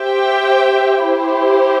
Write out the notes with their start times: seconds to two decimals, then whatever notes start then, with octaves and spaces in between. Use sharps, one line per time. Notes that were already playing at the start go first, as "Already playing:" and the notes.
Already playing: G4 C5 E5 G5
1.04 E4 G4 C5